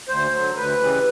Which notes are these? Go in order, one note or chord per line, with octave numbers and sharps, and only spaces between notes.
D2 C5
D3 F#3
D2 B4
C#3 E3 G3